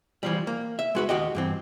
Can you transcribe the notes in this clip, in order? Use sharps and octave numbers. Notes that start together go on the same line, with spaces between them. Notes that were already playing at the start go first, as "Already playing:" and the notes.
E3 F3 G3
A#3
E5
G#3 F#4 B4
D#2 F#4 G4 D#5
G2 E3 C4